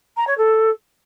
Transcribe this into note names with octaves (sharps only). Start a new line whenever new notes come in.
A#5
C#5
A4